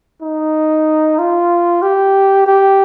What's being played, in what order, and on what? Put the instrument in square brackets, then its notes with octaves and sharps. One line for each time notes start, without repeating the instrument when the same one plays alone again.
[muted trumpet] D#4
F4
G4
G4